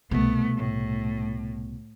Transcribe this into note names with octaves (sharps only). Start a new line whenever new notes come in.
C2 B2 A3 B3
A2